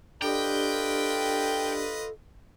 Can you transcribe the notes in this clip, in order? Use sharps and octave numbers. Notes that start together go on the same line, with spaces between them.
D4 F4 G4 A4 B4 D5 D#5 G5